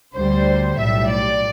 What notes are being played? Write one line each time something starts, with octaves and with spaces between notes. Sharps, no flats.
D2 D3 G3 C5
B1 A2 G3 E5
D5